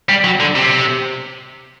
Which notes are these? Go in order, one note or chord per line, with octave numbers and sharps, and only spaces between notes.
G3
F#3
D3
C3